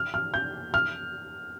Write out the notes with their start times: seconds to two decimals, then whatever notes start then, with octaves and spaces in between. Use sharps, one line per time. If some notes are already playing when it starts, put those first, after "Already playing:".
Already playing: F6
0.14 F6
0.34 G6
0.74 F6